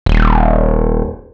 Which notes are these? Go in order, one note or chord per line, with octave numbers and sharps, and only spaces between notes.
D#1